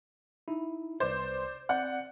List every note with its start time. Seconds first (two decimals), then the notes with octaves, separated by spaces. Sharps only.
0.48 D#4 E4
1.00 C2 B4 C5 D5
1.69 C4 D5 F#5 G6